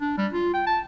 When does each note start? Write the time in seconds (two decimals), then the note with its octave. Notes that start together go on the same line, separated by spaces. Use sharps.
0.01 D4
0.18 G3
0.33 F4
0.54 G5
0.67 A5